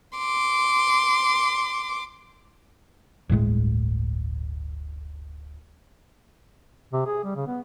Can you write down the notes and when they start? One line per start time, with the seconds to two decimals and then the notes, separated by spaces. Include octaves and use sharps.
0.19 C6 D6
3.29 D1 G1 A2 G#3
6.93 C3
7.06 G#4
7.24 G3
7.35 C#3
7.47 B3